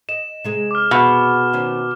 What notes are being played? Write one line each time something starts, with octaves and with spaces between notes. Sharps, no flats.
D#5 E7
C3 G#3 G#4
D6 F6
B2
D#3 C4 C#4